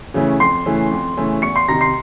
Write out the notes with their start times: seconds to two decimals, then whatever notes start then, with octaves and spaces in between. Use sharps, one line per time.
0.14 C#3 E3 A3 C#4
0.40 F2 C6 C7
0.66 C#3 E3 A3 C#4
0.91 F2
1.17 C#3 E3 A3 C#4
1.42 E2 C#6 C#7
1.56 C6 C7
1.68 C3 D#3 A#5 A#6
1.81 C6 C7